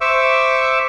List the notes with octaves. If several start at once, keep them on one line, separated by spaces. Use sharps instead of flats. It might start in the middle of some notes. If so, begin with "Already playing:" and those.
C5 E5 C#6 D6 E6